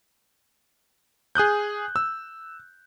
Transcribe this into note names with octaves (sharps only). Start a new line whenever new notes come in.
G#4 D#6 F#6 G6
E6